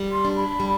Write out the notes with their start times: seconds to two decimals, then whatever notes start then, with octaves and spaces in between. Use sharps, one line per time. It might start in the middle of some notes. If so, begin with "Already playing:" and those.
Already playing: G3
0.12 C6
0.25 D4
0.37 B5
0.60 G3